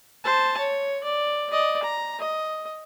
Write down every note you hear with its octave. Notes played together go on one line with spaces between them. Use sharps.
C5 A5
C#5
D5
D5 D#5
A#5
D#5